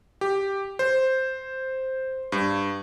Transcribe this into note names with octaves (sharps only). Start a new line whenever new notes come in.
G4
C5
G2